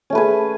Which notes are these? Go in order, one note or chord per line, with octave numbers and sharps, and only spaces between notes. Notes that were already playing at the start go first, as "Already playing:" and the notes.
A3 C#4 G#4 B4